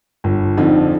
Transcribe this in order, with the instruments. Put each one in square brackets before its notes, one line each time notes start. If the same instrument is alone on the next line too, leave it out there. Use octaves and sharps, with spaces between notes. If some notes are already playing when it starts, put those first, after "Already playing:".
[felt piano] G1 [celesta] F4
[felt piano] F2 D3 F3 C4 [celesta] D#4